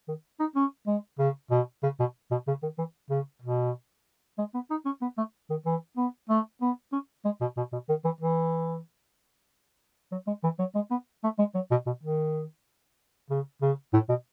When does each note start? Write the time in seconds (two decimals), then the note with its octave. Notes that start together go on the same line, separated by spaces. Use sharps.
0.08 D#3
0.40 D#4
0.56 C#4
0.87 G#3
1.19 C#3
1.51 B2
1.83 C#3
2.00 B2
2.31 B2
2.48 C#3
2.63 D#3
2.78 E3
3.10 C#3
3.42 B2
4.38 G#3
4.54 B3
4.71 D#4
4.86 C#4
5.02 B3
5.18 A3
5.50 D#3
5.66 E3
5.97 B3
6.29 A3
6.62 B3
6.92 C#4
7.25 G#3
7.41 B2
7.57 B2
7.73 B2
7.89 D#3
8.05 E3
8.21 E3
10.12 F#3
10.27 G#3
10.44 E3
10.59 F#3
10.75 G#3
10.91 B3
11.24 A3
11.39 G#3
11.55 F#3
11.71 B2
11.86 B2
12.03 D#3
13.30 C#3
13.62 C#3
13.94 A2
14.09 B2